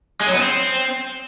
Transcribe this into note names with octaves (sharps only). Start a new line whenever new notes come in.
G#3
F#3
B3
C4